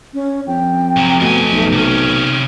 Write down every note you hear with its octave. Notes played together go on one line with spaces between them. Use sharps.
C#4
F2 G5
C2 F#3
F2 B2 A3 G#5
B1
C3 C#4